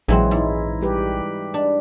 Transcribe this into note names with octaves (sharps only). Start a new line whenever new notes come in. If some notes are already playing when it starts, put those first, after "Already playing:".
A#1 E3 F#3 G#3 C4 G#4
G#2 D#4 E4
G3 G4 B4
D4